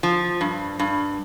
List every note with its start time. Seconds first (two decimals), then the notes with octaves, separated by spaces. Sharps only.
0.03 F3
0.41 G2
0.79 G2